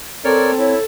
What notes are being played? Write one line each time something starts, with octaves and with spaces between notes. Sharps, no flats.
C4 A4 A#4 C#5 D5
E4 C#5